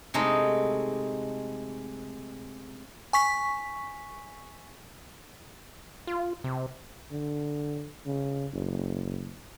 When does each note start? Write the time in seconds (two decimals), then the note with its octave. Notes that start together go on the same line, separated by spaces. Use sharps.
0.14 C3 G#3 A3 D#4
3.13 G#5 C#6 B6
6.07 F4
6.44 C3
7.12 D3
8.06 C#3
8.53 F#1